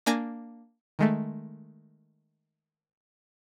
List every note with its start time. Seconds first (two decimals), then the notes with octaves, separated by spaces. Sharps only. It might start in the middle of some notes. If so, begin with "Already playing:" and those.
0.06 A#3 D4 G#5 D6 G#6 A#6
0.99 D#3 G#3 A3